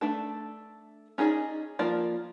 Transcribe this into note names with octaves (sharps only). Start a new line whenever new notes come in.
A3 D4 A4
C#4 D#4 G#4 A4 D5
F3 A#3 F4 D5